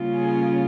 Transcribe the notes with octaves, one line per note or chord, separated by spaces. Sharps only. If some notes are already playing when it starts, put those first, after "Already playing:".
Already playing: C#3 G3 A#3 C#4 F4
G#4